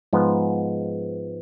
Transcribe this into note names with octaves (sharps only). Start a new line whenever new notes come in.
G#2 F3 G#3 B3